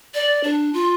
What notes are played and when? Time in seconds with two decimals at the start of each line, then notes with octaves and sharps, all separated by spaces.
0.14 D5
0.44 D4
0.74 F4